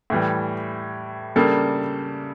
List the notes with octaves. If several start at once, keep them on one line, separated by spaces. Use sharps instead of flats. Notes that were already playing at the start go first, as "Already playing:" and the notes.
A2 E3 G3
C#3 G3 A#3 D4 A4